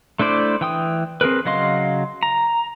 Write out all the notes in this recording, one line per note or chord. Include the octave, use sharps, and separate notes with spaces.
A3 D4 E4 C5 D5
E3 G5 D#6
C4 G#4 A#4 B4
C#3 F#3 D#5 F5 C6
A#5